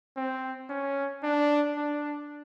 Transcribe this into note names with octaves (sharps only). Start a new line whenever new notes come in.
C4
C#4
D4
D4